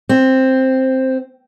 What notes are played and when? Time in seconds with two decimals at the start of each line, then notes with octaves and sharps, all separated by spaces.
0.09 C4